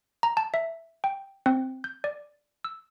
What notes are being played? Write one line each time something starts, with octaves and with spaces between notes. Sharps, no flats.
A#5
A5
E5
G5
C4
G6
D5
E6